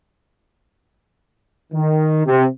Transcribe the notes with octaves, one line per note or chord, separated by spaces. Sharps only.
D#3
C3